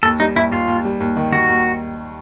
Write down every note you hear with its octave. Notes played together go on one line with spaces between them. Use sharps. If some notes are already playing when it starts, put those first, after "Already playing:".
D#2 A4
G3 D#4
D#2 E4
D#2 F4
D#2
G3
D#2
D#3
D#3 F#4
D#2